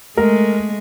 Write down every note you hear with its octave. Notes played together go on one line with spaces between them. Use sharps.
G#3 A3 A#4